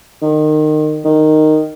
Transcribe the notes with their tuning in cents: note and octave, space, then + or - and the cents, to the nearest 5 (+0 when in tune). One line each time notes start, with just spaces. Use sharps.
D#3 -25
D#3 -10